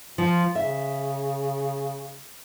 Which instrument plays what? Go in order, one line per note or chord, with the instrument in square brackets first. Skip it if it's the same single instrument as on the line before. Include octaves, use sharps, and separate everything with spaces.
[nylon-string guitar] F3 [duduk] F4
[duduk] C#3 [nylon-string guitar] E5